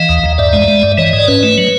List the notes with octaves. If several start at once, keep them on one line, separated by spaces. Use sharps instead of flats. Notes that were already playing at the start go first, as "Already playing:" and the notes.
Already playing: E3 D#5 F5
D#2
D#2
G2 D5 E5
G#3
G#3
G2
E3 C#5 D#5
G#2
D5
C#4 B4 C#5
A3
F#3